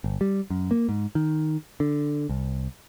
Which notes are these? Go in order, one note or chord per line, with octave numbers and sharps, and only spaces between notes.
G1
G3
F#2
A#3
G#2
D#3
D3
C2